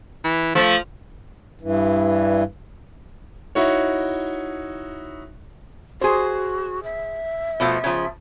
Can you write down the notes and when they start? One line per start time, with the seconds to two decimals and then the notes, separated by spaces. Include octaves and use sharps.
0.24 E3
0.55 F3 A3
1.59 G2 E3
3.55 D#4 E4 F#4 C#5
6.01 F#4 G#4 C5
6.84 E5
7.60 B2 F3 A3
7.84 C#3 F3